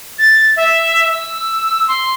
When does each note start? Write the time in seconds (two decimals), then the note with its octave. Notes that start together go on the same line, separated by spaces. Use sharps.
0.19 A6
0.56 E5
1.12 E6
1.88 C6